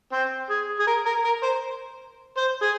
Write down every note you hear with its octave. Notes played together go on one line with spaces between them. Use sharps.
C4
G#4
G#4
A#4
A#4
A#4
C5
C5
G#4